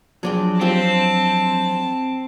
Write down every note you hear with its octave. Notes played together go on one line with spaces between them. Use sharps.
F3 F#3 D4 G#4 D5 G5
C4 F4 G4 C5 A5